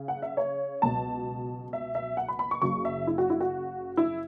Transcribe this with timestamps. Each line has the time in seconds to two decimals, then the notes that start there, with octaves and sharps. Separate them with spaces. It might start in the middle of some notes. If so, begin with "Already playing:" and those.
Already playing: C#3
0.08 F#5
0.22 E5
0.37 C#5
0.82 C#2 B2 F#3 A5
1.73 E5
1.95 E5
2.17 F#5
2.28 B5
2.39 B5
2.51 C#6
2.62 F#1 F#2 C#3 F#3 C#6
2.85 E5
3.07 E4
3.18 F#4
3.30 E4
3.40 F#4
3.97 E4